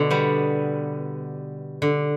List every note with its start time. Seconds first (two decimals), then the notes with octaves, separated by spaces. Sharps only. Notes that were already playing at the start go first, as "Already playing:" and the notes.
Already playing: B2 D3
0.11 G3 B3
1.82 D3